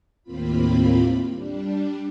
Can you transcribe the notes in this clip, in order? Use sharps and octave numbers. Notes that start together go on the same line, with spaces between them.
D#2 A2 A#3 C4 F4 B5
G3 D4